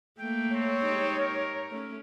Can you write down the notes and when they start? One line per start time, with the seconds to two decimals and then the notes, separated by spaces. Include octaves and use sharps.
0.19 A3 A#3 G5
0.54 C4 C#5
0.84 G#3 D#4 G4
1.19 A#4
1.71 A3 C#4